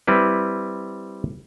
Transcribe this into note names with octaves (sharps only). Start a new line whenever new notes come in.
G3 C4 E4 B4